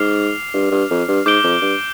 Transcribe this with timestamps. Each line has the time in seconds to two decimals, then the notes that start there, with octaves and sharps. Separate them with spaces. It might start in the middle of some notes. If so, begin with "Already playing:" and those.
Already playing: G#2 D6 F6 C7 F7
0.54 G2
0.71 G2
0.90 F2
1.08 G2
1.26 G#2 D6 G6 D7 G7
1.44 F2
1.62 G2